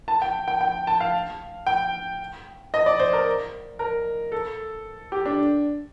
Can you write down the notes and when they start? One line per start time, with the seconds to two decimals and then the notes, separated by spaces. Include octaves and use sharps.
0.08 A5
0.22 G5
0.48 G5
0.61 G5
0.87 A5
1.00 F5
1.67 G5
2.74 D#5
2.86 D5
3.00 C5
3.13 A#4
3.79 A#4
4.32 A4
5.12 G4
5.26 D4